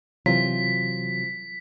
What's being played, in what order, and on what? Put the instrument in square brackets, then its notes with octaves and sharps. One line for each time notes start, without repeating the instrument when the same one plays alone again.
[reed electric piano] C3 E3 [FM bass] F#3 [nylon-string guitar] C4 F4 [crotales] B6